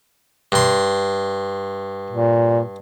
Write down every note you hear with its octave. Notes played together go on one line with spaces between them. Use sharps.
G2 C6
A#2